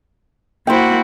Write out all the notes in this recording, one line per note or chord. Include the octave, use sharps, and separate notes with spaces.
A#3 E4 F#4 C5 G5